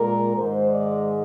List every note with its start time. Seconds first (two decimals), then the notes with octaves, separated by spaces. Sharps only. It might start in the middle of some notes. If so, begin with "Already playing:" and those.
Already playing: A#2 G#3 A#4
0.36 G#2 D#3 G#3 C5
0.70 D5